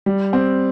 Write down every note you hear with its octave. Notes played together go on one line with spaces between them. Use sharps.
G3
C4